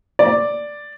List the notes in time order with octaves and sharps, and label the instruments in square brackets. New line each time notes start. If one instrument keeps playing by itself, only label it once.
[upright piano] D5